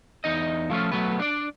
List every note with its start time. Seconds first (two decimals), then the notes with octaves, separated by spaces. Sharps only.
0.24 E2 D#4 D#5
0.70 F3 A3 C#4 F4
0.92 F#3 A3 B3 B4
1.19 D4 D5